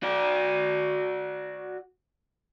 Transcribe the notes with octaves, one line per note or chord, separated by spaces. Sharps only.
F#4 D5